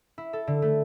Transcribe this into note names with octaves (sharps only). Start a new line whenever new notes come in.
E4
A4
D3
A3